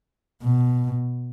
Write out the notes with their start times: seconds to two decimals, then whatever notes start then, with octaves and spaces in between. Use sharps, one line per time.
0.42 B2